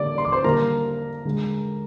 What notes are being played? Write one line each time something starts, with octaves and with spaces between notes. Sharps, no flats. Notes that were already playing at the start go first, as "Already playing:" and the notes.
Already playing: D3 G3 A#3 D5 D6
C6
D6
C5 C6
D3 G3 A#3 A#4 A#5
D3 G#3